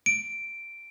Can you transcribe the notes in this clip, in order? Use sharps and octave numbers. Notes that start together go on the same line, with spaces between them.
D7